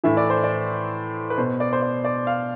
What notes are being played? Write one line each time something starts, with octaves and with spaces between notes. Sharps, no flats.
A2 E3 E5
D5
C5
D5
B4
B2 C5
D5
C5
D5
D5
F5